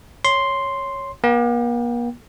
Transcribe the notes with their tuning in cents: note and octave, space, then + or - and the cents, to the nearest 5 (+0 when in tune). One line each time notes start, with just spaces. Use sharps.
C#5 +0 C6 +0
A#3 +45 G5 +0